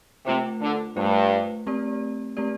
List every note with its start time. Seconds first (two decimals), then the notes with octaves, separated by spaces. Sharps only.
0.26 C3 A3 F4 C5
0.61 D3
0.96 G2 A3 F4 C5
1.67 A3 C4 G4 D5
2.37 A3 C4 G4 D5